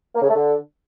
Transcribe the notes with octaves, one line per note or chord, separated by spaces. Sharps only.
A#3
C#3
A3
D3